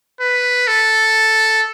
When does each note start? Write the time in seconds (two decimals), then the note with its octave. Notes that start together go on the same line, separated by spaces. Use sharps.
0.20 B4
0.67 A4